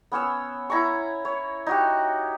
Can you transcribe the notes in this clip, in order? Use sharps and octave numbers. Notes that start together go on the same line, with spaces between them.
B3 C#4 C#5 E6
E4 A#5 B5 C#6
C#5
D#4 F#4 G4